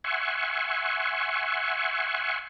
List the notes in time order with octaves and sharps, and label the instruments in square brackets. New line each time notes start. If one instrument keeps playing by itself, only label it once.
[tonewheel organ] E5 F#5 G#5 C6 C#6